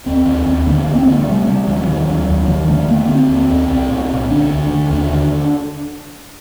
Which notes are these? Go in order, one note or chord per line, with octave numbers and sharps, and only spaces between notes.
D#2 C4
D#2
D#2
D3 A#3
D2
C4
D3 A#3
A3
C3 G3
C3 G3
D2 G3
F#3
D#2 D#3
F#3
D#2
D#2
D#2 D#3
D3 A3
D3 A#3
D3 C4
D#2
D#2
C2
A#2
C2
D3 D4
D2
D3
D#2 D4
D3